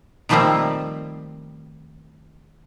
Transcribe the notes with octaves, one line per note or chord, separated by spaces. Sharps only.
D#3 F3 G3 A3 A#3 C4